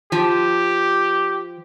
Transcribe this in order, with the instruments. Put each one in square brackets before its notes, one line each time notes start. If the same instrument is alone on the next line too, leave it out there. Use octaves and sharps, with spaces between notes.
[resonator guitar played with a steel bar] F3 [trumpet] G4